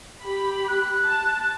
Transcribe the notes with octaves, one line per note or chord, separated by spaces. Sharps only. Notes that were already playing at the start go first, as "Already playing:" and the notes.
G4 B5
F#6
A5